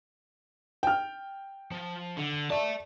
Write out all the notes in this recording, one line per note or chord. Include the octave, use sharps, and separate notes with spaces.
G5 F6
F3
D3
D5 E5 A5